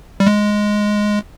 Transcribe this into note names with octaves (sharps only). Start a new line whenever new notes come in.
G3
G#3